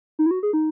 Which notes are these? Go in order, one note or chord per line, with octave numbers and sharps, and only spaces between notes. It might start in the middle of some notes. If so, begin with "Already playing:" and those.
D#4
E4
F#4
G#4
D#4